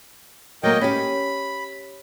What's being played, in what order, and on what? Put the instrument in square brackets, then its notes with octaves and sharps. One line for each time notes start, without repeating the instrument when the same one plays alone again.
[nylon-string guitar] F#3 A#3 [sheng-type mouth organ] A#4 D#5 G5
[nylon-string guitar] C#4 G4 [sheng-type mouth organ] B5